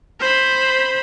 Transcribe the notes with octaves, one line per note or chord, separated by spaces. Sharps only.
C5 B5